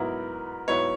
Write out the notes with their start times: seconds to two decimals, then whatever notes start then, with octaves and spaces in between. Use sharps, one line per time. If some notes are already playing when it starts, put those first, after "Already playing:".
Already playing: G#2 F#3 B3 E4 A#4
0.68 G#2 F#3 B3 E4 C#5